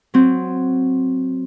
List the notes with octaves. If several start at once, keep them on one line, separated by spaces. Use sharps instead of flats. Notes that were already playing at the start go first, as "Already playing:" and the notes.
F#3 C4